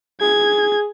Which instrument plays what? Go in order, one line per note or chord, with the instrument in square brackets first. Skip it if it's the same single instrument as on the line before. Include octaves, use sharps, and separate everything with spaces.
[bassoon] G#4 [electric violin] G#6